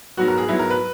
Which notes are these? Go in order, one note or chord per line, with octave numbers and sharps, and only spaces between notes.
G#2 F#3 B3 F#4
A#4
G#4
G#2 F#3 B3 E4
A#4
B4